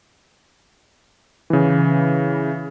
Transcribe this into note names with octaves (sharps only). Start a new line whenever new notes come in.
C#3 E3